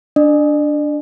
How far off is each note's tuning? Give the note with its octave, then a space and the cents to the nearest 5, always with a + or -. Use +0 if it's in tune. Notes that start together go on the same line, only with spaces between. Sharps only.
D4 +0 D5 +45